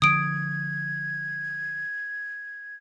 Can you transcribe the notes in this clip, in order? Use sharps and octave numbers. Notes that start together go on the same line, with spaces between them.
D3 F3 D#6 G#6 D7